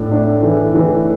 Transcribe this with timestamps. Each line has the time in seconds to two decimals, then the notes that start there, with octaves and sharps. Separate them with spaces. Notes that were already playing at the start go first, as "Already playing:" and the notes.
Already playing: A2 D4
0.11 D4
0.43 E3
0.74 E3